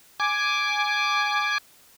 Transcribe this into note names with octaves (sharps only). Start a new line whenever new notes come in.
G#5 D6